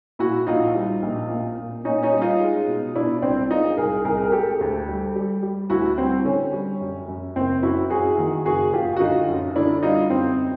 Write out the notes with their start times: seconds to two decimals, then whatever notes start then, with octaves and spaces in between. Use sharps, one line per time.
0.19 A#2 E4 F#4
0.47 A#1 D#4 F4
0.75 G3
1.02 A#1
1.29 A#2
1.58 A#2
1.84 A#2 C#4 D#4
2.03 C#4 D#4
2.13 G3
2.21 D#4 F4
2.40 G#3
2.67 B2
2.95 B2 D4 E4
3.22 C2 C4 D4
3.51 G#3 D#4 F4
3.77 C2 G#4 A#4
4.05 C2 G#4 A#4
4.24 A#4
4.32 G#3 G4 A4
4.61 D2
4.88 G3
5.16 G3
5.43 G3
5.70 D2 E4 F#4
5.98 G3 C4
6.25 D3 C#4
6.53 G3
6.81 F#2
7.08 F#2
7.36 F#1 C4
7.63 F#2 E4 F#4
7.90 F#2 F#4 G#4
8.18 D#3
8.45 F#1 F#4 G#4
8.73 F#1 F4 G4
8.96 F#4
9.00 D3 D#4 F4
9.28 F#2
9.56 D3 D4 E4
9.83 G3 D#4 F4
10.10 F#2 C4